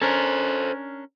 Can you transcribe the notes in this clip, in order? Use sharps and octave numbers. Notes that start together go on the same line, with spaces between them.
C#4 D4 A4 A#4 C5